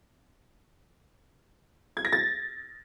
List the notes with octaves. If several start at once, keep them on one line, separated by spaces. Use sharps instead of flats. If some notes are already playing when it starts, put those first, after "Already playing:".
G#6
A#6
A6